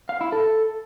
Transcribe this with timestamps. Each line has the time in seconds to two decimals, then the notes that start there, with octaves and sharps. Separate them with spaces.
0.09 F5
0.21 E4
0.32 A4